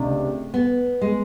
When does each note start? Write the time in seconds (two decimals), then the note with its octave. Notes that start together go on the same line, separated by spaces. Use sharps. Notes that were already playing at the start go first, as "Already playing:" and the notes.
Already playing: C#2 C3 A3 D4
0.54 B3
1.02 G#3